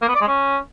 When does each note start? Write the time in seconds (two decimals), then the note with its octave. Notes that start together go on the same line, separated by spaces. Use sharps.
0.02 A#3
0.08 B3
0.15 D5
0.21 G#3
0.28 C#4